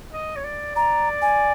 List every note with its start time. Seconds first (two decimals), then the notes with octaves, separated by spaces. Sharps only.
0.13 D#5
0.36 C#5
0.44 D5
0.75 D5 A#5
1.22 G#5